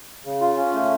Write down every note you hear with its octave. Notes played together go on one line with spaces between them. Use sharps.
C#3
F4
C#4
A3